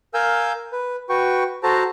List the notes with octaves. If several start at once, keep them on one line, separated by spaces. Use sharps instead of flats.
A#4 F5 G#5 E6 G6
B4
F#4 B4 G5 C#6
F#4 A4 C5 A5 A#5